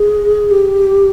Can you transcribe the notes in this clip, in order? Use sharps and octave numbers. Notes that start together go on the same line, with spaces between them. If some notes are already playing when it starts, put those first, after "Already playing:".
Already playing: G#4
G4